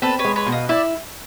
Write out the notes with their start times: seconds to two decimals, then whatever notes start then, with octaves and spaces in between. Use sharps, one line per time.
0.02 C4 A4 B4
0.19 B4 C#5
0.25 G#3
0.36 B4 C#5
0.46 B2
0.52 D#5 F5
0.69 E4 D5 E5